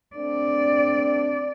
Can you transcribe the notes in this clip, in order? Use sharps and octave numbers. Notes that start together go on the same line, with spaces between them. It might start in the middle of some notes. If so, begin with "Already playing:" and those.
A3 C4 D4 D5